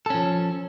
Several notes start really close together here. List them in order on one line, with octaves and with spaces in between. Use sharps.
A4 C#4 F3